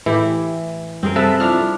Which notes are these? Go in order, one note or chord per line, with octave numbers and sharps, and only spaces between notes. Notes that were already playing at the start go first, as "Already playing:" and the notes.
A2 E3 E4 G4
F#2 G3 C4 G#4 A#4
C3 A4 B4 E5 A5
F3 D4 E4 F6